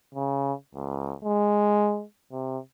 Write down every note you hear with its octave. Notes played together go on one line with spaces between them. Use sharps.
C#3
C#2
G#3
C3